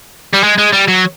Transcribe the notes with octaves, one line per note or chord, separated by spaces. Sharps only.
G3
G#3
G#3
G3
F#3